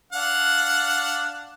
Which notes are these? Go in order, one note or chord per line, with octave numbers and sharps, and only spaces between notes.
D4 F5 F#5